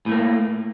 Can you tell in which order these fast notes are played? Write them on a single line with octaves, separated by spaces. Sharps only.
A2 A3 A#3